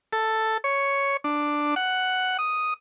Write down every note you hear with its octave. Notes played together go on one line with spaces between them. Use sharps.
A4
C#5
D4
F#5
D#6